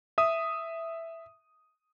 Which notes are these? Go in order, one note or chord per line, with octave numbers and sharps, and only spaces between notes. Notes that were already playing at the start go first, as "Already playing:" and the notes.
E5 D#6